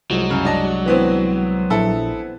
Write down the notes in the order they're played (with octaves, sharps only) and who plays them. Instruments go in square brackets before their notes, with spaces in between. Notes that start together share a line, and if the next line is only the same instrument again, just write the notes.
[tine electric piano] C2 G#3 [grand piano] F3 [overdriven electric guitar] F#3
[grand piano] F#2 C#3
D4 D#5 A5
[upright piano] E3 B3 C4
[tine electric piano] A#1 [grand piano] E4 A4